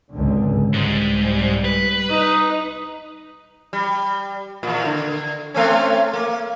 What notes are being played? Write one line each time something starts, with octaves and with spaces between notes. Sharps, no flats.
G#1 C#2 D3
C2 G#2 G3
B4
D#4
G3
D#2 A#2
D3
A3 C4 C#4
A#3